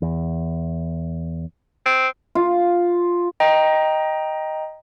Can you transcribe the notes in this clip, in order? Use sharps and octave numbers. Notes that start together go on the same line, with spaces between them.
E2
C4
F4
D#5 G5 A#5